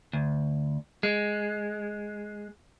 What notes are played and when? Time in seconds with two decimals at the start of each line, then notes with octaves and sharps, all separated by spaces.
0.13 D2
1.03 G#3